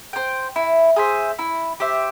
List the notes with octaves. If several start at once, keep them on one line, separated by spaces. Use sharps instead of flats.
C5 G5
E4
G#4 C5 E5
E4
G4 C5 E5